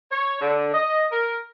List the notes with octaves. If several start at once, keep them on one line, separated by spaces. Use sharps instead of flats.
C#5
D3
D#5
A#4